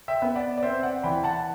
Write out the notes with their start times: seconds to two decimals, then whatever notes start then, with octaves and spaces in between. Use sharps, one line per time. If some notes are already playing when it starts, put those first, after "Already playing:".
0.08 E5 G5
0.22 B3
0.36 D5 F#5
0.58 D5
0.62 C4 C5 E5
0.83 D5 F#5
1.03 E3 G5 B5
1.24 F#5 A5